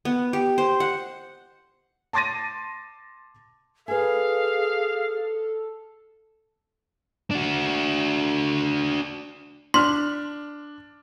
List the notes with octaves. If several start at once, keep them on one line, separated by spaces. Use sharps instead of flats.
B3
G4
C5
F#5
A5 C6 D6 A6 A#6 D#7
G#4 A4 B4 F5 G#5
D4 F#4
D4 C6 F6